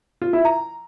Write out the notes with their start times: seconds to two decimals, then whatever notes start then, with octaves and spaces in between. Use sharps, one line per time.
0.22 F4
0.33 E4
0.45 A#5